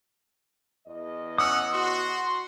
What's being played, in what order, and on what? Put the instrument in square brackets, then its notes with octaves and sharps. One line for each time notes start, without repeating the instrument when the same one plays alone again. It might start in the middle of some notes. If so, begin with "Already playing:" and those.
[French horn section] E2 D#5
[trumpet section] C#4 F#5 [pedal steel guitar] D#6 E6
[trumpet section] F#4 [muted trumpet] C6